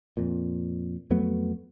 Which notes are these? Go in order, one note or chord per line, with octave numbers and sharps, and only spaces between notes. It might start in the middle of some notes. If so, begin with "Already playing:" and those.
F2 A#2
F2 F#3 A3 B3